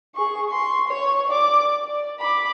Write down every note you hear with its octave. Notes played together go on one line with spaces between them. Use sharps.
G#4 C#6
C6 C#6
C#5 C#6
D5 D6
D5
B5 D6